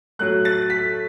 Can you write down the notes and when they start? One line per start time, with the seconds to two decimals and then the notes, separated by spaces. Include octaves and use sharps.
0.19 A2 F#3 A3 F#6
0.45 A6
0.70 B6